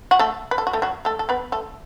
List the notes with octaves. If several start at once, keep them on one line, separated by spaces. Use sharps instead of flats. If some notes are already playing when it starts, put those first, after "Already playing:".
F#4
A3 A4
B4
A4
F#4
A3 A4
F#3 F#4
A3 A4
A4
B3 B4
A3 A4